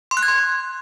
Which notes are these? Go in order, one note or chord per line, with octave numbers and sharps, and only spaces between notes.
C6
F#6
G#6
C6